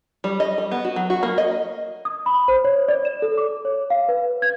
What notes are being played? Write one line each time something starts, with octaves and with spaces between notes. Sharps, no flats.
G3
D#5
G3
B3
F#4
F#3
F#4
A#3
D#5
D#6
B5
C5
C#5
D5
E7
A4
D6
C#5
F5
B4
G#6